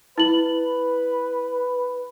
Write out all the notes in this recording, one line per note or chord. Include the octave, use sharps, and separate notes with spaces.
E4 B4 F#7